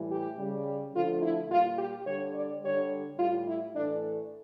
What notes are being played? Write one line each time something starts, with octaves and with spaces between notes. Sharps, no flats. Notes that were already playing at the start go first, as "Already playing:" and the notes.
Already playing: A2 E3 G3
G4
C#3 G3
D3 F3 A3 F4
E4
A#2 G3 F4
G4
D3 G3 C#5
D5
D3 G3 C#5
A2 G3 F4
E4
A2 E3 A3 D4